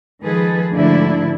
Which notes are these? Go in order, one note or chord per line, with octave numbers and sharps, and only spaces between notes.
D#3 F3 G#3 G#4 A4 B4
D2 G#2 D3 F3 D4 E4